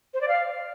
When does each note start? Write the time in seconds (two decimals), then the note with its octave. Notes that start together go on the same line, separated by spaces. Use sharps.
0.14 C5
0.21 D5
0.28 F5